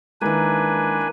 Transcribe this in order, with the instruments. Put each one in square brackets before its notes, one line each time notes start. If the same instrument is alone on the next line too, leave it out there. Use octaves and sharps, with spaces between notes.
[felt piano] D#3 G#3 [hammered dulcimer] E3 A#3 [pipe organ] D4 B4 G#5